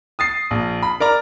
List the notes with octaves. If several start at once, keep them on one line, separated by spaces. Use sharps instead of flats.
D#6 A6 C7
A#1
B5
A#4 D5 A#5